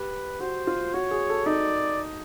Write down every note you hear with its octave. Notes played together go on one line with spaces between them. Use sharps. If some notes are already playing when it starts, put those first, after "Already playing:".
Already playing: G4 B4
F#4 C5
F4
F#4 C#5
G#4
A4
D#4 D5